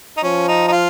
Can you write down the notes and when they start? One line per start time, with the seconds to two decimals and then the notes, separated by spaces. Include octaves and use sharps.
0.17 D#4
0.23 F3 C#4
0.48 D#4
0.68 D#4
0.72 F4